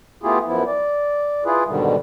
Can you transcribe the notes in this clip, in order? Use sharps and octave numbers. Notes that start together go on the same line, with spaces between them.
A3 B3 E4 F4 G4 G#4
F#2 F3 B3 E4
D5
E4 F4 G#4 B4
G#2 B2 D3 D#3 G3